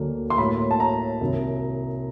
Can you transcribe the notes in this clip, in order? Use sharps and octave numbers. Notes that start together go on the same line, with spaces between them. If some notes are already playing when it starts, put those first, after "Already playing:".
Already playing: D2 D3 F#3 A#3
C6
A2 F#3 A#3 B5
A5
A#5
C2 C3 D#3 F#3